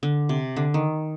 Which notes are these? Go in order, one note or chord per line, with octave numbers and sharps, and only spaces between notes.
D3
C3
D3
D#3